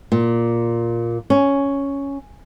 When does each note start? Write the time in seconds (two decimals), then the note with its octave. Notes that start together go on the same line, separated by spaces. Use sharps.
0.12 A#2
1.30 C#4